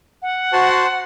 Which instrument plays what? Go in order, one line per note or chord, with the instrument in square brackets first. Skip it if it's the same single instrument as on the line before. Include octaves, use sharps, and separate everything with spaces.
[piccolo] F#5
[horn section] F#4 [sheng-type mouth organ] C5 A5 C6